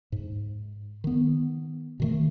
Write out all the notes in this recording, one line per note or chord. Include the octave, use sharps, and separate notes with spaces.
G#2
D#3 B3
B2 D#3 A3